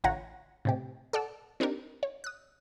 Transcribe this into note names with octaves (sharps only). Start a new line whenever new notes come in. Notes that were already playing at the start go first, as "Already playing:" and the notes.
A1 D3 F4 C#5 F#5 A#5
A2 C3 G4
A4 D5 F#5 E6
C4 D4 D#4 G4 A#4
C#5
D#6 F#6